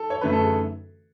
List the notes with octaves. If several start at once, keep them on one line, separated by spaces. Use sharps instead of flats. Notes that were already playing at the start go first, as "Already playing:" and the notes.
Already playing: A4
C#5
F#2 D3 A3 C#4 B4
A4
G#4